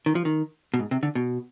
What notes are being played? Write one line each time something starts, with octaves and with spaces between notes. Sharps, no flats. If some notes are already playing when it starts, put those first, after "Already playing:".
D#3
F3
D#3
B2
G#2
C3
D3
B2